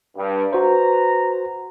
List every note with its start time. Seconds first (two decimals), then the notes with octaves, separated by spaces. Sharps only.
0.17 G2
0.53 F#4 B4 C5 A#5